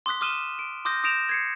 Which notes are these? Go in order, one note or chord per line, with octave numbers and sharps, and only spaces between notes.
C6 D6 D#6 F#6 B6
D6 D#6 F6 D#7 E7 G7
D7
C6 D6 D#6 F6 G6 A#6
D#6 G6 A#6 D7 E7 F7
G#6 C7 C#7